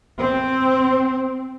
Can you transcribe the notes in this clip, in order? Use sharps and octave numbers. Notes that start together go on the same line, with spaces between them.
C4